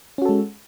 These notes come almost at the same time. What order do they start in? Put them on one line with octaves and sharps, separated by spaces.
C#4 F#4 A4 G#3